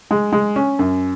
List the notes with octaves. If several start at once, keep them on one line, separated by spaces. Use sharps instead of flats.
G#3
G#3
C#4
F#2